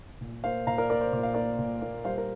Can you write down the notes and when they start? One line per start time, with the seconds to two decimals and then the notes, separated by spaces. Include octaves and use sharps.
0.21 A#2
0.44 A#3 C5 F5
0.67 A#2 F5 A#5
0.78 A#4 D5
0.90 A#3 A#4 D5
1.01 C5
1.12 A#2 D5
1.23 F5
1.34 A#3 A#4 D5
1.58 A#2
1.82 A#3
2.05 G3 C5 F5
2.18 A#4